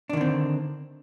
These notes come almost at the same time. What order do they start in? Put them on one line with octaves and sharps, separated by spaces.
D4 D#3 D3 C4